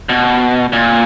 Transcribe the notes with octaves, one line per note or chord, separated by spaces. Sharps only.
B2
A#2